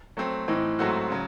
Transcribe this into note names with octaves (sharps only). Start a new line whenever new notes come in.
F#3 A3 C4
A2 E3 C4 D#4
G#2 F#3 A3 C4 F#4
C#3 F#3